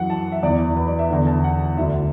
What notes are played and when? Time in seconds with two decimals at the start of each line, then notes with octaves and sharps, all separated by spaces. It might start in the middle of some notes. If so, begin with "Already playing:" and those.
Already playing: F#2 E3 F#5
0.10 A5
0.32 E5
0.43 E2 E3 D5
0.77 B4
0.88 D5
0.99 E5
1.10 E2 D3
1.27 A5
1.44 F#5
1.77 D2 D3 E5